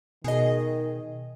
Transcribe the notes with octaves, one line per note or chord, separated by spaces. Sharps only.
B2 D#3 G#4 D#5